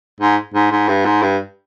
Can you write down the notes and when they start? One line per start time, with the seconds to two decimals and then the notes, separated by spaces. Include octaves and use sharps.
0.20 G#2
0.54 G#2
0.71 G#2
0.89 G2
1.05 G#2
1.22 G2